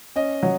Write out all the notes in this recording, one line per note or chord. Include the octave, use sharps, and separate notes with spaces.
C#4 D#5
F#3